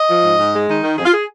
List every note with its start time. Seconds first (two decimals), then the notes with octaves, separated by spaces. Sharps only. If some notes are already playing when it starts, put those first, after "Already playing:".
Already playing: D#5
0.09 F3
0.24 G#2
0.39 G#2
0.54 G#3
0.69 D#3 D#4
0.83 D#3
0.98 F2 G#4
1.05 F4
1.13 G#4